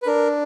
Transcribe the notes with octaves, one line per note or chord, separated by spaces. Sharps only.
B4
D4 A#4